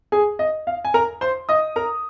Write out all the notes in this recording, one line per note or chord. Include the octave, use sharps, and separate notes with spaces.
G#4 G#5
D#5
F5
G#5
A#4 A#5
C5 C6
D#5 D#6
A#4 A#5